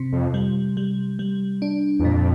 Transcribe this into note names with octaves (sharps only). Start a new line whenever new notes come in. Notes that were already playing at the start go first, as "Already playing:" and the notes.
Already playing: C3 C4
F2
G3
G3
G3
D4
E2
F2 A#2